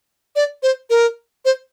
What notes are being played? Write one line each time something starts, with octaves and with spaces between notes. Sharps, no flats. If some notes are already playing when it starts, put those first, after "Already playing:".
D5
C5
A#4
C5